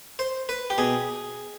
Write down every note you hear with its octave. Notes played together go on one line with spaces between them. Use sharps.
C5
B4
G4
B2 G#4